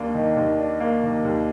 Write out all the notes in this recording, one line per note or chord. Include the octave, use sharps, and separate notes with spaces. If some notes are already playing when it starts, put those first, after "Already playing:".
Already playing: D#2 A#3 D4
D#3
D#2
D4
A#3
D#3
D#2